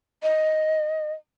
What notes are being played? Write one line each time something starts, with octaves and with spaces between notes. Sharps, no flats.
D#5